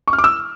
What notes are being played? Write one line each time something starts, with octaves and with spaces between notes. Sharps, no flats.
C#6
F6
D6
E6